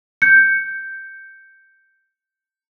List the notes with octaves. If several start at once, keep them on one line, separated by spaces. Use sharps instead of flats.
G6 C#7